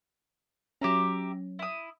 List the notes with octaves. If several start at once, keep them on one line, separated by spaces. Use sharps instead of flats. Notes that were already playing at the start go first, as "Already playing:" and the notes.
F#3 C#4 G4 E5 A#5
E4 D#6